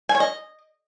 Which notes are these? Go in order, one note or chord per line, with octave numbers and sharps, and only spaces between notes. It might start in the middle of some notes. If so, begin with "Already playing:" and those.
G#5
C#5
D#5